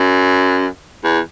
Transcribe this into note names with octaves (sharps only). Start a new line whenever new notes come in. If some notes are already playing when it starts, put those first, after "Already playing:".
Already playing: F#2
E2